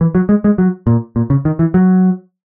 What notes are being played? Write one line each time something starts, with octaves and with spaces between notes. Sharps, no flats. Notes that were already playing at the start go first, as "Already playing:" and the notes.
E3
F#3
G#3
G#3
F#3
A#2
A#2
C#3
D#3
E3
F#3